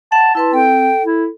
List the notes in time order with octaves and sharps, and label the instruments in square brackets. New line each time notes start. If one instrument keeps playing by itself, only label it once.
[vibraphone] F#5 [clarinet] A5
[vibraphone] E4 B4 C6 [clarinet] A5
[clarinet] C4 [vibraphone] A4 [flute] G5
[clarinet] E4